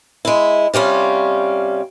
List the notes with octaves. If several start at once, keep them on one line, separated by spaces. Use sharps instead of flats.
G#3 E4
C3 G3 C#4 F4